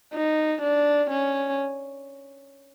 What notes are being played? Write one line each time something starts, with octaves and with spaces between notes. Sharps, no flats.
D#4
D4
C#4